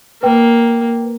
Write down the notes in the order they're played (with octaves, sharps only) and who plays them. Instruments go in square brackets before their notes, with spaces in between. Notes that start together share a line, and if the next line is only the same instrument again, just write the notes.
[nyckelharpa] A#3 [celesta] B4 G5